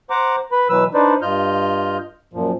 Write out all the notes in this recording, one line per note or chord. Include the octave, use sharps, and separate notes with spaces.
C5 F#5 A#5 D6
B4 B5
B2 E3 F#3 B4 E6
D4 D#4 B4 C5 D5
G2 F4 D#5 F6 G6
F#2 A#2 F3